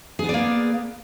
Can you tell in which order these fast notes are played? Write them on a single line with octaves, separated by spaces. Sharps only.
G#4 B3 D5 A#3